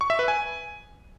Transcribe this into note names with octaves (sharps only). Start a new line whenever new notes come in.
C#6
E5
B4
G#5